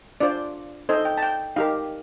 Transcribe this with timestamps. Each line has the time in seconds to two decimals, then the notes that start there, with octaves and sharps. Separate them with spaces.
0.20 D4 F4 C5 D5
0.89 D#4 A4 C5 D#5
1.05 G5
1.18 A5
1.22 G5
1.56 D#4 G4 A#4 F5